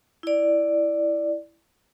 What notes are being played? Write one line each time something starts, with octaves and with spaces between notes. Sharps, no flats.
E4 D5